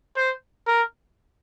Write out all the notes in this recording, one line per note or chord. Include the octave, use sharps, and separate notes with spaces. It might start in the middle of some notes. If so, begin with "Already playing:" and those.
C5
A#4